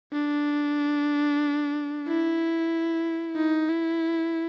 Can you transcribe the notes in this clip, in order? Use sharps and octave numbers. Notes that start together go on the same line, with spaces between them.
D4
E4
D#4
E4